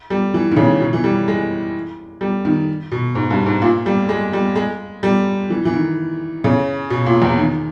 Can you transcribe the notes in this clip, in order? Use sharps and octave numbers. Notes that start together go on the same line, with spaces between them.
G3
E3
D#3
C#3
B2
E3
G3
G#3
G3
D#3
B2
G#2
G2
G#2
A#2
G3
G#3
G3
G#3
G3
E3
E3
D#3
C#3
B2
A#2
E2
D#3